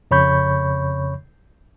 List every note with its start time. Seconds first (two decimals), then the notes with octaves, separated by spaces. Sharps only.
0.11 F2 C#3 C#5 B5 C#6 G6